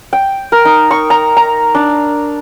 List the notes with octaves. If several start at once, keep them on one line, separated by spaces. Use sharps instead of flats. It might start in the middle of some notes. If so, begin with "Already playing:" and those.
G5
A#4
D#4
C#6
A#5
A#5
D4